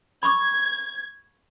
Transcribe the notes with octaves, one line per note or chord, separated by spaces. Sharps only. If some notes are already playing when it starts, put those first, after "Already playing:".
B5 C#6 D6 G#6